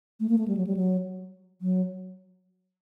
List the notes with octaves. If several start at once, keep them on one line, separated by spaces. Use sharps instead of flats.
A3
A#3
A3
G3
F#3
G3
F#3
F#3